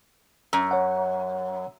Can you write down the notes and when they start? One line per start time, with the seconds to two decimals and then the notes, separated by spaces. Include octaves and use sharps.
0.53 F#2
0.71 C#5 F#5